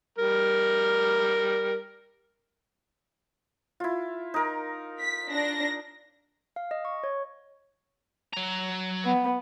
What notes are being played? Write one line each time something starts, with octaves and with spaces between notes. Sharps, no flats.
G3 A#4
E4 F4
D#4 A#4
B6
D4 A#6
F5
D#5
C#6
C#5
F#3 A#5
B3